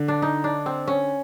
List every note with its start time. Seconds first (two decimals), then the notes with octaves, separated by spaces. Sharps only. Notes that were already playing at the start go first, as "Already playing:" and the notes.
Already playing: D3
0.08 D4
0.22 D#4
0.44 D4
0.66 C4
0.88 C#4